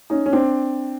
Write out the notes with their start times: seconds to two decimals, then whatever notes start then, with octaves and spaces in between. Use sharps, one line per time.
0.10 C#4 D#4
0.26 C#4
0.33 C4 D4